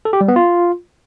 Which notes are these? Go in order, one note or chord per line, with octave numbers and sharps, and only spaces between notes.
A4
G4
G3
B3
F4